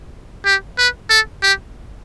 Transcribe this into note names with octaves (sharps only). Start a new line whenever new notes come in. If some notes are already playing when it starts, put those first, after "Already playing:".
G4
B4
A4
G4